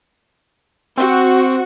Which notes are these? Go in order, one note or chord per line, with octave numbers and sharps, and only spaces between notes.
C4 F#4